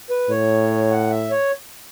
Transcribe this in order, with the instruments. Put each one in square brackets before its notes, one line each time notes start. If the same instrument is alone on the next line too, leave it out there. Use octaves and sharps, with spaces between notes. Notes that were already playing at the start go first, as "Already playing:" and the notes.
[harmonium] B4
[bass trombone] A2 [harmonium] C#5
[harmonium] F#5
E5
C#5